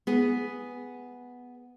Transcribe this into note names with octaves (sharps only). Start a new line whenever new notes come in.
B3 G#4